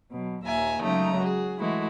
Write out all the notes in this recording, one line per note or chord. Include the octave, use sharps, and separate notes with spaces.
B2 F#3
D#2 A#2 E5 G#5 A#5
C#3 F#3 G#3 A3 D#4 A#5
F#4 G#4
E3 G#3 A3 E4 F#4